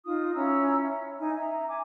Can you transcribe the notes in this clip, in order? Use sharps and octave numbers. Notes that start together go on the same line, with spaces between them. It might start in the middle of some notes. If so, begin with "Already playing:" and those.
D#4 F4 D#6
C#4 E4 A#5 E6
E5
D#4 G#5
E5 A#5
G#5 D6